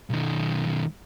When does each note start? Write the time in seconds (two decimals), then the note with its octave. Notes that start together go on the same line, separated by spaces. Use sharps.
0.10 B1 D#3